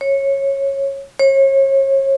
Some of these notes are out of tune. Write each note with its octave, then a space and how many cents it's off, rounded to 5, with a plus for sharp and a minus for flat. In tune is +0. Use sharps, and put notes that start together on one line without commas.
C#5 -15
C#5 -35